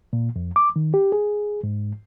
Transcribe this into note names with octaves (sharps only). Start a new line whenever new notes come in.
A#2
F2
D6
D#3
G4
G#4
G#2